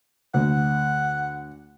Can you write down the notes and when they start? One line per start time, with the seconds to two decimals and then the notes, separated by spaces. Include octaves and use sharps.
0.34 D2 F#5